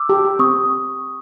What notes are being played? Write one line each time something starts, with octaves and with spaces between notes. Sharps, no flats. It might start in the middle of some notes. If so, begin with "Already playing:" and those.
Already playing: D6 E6
G4
G4
C4 C#6 D#6